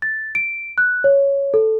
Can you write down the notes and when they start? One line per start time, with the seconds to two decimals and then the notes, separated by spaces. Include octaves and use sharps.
0.02 A6
0.35 D7
0.78 F#6
1.04 C#5
1.54 A4